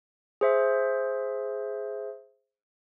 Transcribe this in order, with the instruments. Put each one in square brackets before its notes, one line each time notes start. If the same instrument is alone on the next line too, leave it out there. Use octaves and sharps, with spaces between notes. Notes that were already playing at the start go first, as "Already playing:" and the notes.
[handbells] G#4 C5 E5